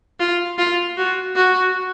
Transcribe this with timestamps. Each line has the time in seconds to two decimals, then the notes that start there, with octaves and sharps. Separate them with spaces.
0.20 F4
0.58 F4
0.97 F#4
1.36 F#4